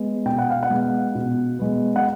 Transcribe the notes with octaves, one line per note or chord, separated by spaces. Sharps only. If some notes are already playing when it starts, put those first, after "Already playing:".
Already playing: G#3 B3
B2 G5
F#5
F5
F#5
G#3 B3
B2
G#3 B3
F#5